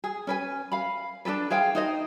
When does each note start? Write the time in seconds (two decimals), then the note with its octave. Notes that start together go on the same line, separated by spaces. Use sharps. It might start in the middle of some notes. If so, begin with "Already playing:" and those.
0.04 G#4
0.27 C#4 B4 G#5
0.72 F5 B5
1.25 D4 F4 A4 B4
1.50 G#4 C5 F5 G5
1.75 D#4 C5 D#5